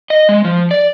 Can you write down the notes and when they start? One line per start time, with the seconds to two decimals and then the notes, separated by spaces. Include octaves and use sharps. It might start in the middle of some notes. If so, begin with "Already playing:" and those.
0.10 D#5
0.29 G#3
0.45 F3
0.71 D5